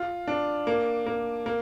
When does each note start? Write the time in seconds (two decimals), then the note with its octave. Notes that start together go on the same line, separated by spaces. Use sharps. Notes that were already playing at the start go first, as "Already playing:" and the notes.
Already playing: F4
0.28 D4
0.67 A#3
1.06 A#3
1.46 A#3